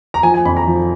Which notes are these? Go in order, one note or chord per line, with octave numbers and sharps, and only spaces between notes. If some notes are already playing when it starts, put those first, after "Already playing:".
A#5
F3 G#5
G#5
F2 B5
A#5
F3